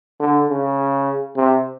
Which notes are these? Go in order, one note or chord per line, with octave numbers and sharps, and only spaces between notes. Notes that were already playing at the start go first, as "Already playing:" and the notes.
D3
C#3
C3